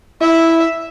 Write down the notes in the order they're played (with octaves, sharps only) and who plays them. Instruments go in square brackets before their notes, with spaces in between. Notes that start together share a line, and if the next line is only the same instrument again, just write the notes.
[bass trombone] E4 [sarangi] E5